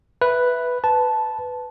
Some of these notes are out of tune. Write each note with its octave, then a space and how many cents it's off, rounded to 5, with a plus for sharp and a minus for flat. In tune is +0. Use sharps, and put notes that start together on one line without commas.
B4 +0 E5 +0
B4 +10 A5 -10